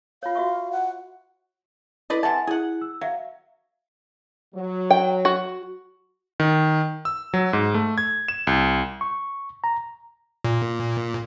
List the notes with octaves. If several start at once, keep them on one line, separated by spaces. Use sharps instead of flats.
F4 C#5 F5
F#4 E5 C#6
F#5
E4 A4 B4 D5 D#5
C3 E3 E5 F#5 G#5 A5
E4 G#4 F#5
E6
F#3 E5 F5
F#3
G5
F#4
D#3
E6
F#3
G#2
A3
G#6
E7
C2
C#6
A#5
A#2